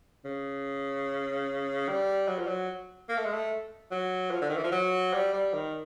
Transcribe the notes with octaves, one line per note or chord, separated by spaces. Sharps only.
C#3
G3
F#3
F3
F#3
A#3
A3
G#3
A3
F#3
F3
D3
D#3
E3
F3
F#3
G3
G3
D#3